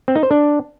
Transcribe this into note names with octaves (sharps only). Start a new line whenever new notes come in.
C4
D#4
C5
D4